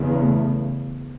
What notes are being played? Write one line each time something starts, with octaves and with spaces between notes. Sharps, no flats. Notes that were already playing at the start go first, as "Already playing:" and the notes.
Already playing: E2 C#3
A3